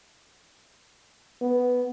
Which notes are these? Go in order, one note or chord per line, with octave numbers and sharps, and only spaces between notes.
B3